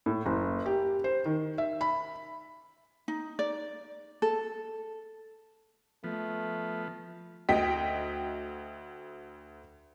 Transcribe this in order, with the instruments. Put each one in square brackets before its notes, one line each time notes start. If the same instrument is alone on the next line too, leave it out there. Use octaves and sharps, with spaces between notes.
[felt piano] A2
F#1
G4
C5
D#3
E5
B5
[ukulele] D#4
D5
A4
[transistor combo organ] F3 B3 [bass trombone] A3
[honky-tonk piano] D2 D#5 G5 B6